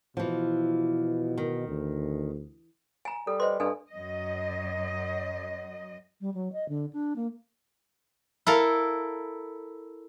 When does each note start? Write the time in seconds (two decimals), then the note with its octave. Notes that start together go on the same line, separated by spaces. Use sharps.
0.17 B2 E3 F3
1.38 D#3
1.68 D2
3.05 G#5 A#5 D7
3.27 G3 A4
3.40 B4 C5 D#5 C6
3.60 G2 D4 A4 G#5
3.91 F#2 D#5
6.21 G3
6.34 F#3
6.53 D#5
6.69 D3
6.93 D4
7.16 A#3
8.47 E4 A4 A#4 F5